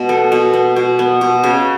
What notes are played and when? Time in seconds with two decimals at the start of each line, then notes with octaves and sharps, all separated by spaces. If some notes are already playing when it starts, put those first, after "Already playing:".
Already playing: B2
0.09 B3 A4
0.32 B2
0.53 B3
0.76 B2
0.99 B3
1.21 B2
1.44 C#3